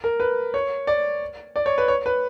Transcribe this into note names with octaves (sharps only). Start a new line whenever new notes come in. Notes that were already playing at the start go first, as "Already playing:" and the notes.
A#4
B4
C#5
D5
D5
C#5
B4
C#5
B4